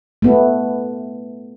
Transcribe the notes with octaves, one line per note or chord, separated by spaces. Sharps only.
A3 B3